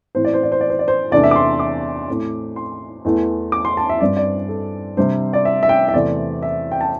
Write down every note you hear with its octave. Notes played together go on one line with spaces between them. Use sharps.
A2 E3 C4 C5
D5
C5
D5
C5
D5
C5
D5
C5
E2 C3 A3 D4 D5
E5
D6
C6
D6
A2 A3 C4
C6
E2 E3 A3
D6
C6
A5
E5
G2 G3 C4 D5
D5
A4
C3 G3 D4 C5
D5
E5
E5
G5
E5
E2 C3 E3 A3 C4 D5
E5
G5
A5